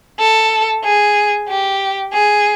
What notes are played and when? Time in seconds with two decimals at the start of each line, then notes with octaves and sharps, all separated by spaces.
0.19 A4
0.84 G#4
1.49 G4
2.13 G#4